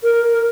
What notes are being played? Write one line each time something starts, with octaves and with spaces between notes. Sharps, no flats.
A#4